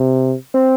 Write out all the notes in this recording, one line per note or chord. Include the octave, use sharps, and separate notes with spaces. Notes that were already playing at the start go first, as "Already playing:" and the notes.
Already playing: C3
C4